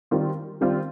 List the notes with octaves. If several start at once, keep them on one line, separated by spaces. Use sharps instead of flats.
D#3 G3 C4 F4
D#3 G3 C4 F4